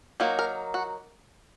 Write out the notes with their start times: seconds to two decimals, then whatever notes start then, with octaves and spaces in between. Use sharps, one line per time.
0.20 F#3 A#3 D#4
0.39 A#4
0.74 F#4